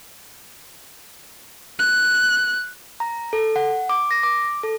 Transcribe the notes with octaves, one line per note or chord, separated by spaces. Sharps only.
F#6
A#5
A4
F#5
D6
A#6
D6
A4